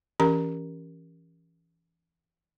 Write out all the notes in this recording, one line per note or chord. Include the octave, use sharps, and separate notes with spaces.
E3 C#4 G4 A#4 A#5